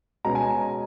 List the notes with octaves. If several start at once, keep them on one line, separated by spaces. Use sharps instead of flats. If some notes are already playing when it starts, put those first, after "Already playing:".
B2 G#3 C#4 A#5
G#5
A#5